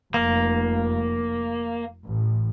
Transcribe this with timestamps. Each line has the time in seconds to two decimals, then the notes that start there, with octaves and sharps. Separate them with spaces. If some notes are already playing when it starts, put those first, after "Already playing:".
0.14 F1 A#3
2.07 A1